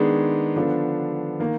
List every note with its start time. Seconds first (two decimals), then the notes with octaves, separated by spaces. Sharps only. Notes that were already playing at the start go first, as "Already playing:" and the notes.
Already playing: D#3 G#3 B3 D4 G#4
0.56 D3 F3 B3 D4
1.40 D#3 A#3